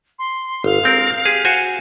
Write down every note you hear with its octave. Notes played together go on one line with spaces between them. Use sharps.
C6
G1 F5
G#3 C4 A#4
G4 G#4
F#4 C5 G#5